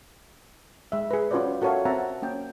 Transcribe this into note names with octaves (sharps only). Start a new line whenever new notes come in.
G#3 E5
G#4 B4
C#4 F4 F#4 B4 C5 D5
F#4 A4 A#4 C#5 E5 F5
C4 E5 F#5 A5 A#5
A#3 C#4 G5